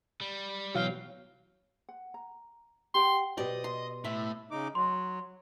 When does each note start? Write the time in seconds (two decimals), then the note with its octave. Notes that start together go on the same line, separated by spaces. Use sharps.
0.21 G3
0.75 G#2 B2 E3 F#3 F5 G5
1.89 F#5
2.14 A#5
2.95 G4 F#5 G5 C6
3.38 B2 G4 D5 D#5
3.64 C6
4.05 A2 E5
4.51 C#3 D#4 D6
4.75 F#3 C6